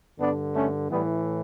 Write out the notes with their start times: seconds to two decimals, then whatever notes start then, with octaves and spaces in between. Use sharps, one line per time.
0.20 G2 D3 B3 D4
0.55 A3 C#4
0.90 A2 E3 G3 B3